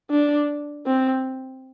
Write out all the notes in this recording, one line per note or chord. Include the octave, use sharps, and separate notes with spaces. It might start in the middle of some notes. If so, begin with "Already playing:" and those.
D4
C4